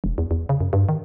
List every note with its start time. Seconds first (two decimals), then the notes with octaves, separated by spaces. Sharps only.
0.04 E1
0.18 E2
0.31 E2
0.49 C#3
0.60 F#2
0.73 G2
0.89 D#3